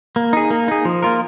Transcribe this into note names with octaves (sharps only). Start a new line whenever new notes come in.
A#3
D#4 G#4
A#3
D#4 G#4
F3
A#3 F4 A#4